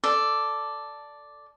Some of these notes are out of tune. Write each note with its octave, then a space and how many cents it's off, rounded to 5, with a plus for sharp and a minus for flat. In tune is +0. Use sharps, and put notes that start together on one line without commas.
A4 +0 D5 +0